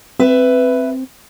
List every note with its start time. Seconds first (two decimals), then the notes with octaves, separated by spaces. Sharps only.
0.19 C4 B4 E5